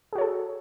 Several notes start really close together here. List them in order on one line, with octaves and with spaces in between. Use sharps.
G#4 F#4 C#5 A4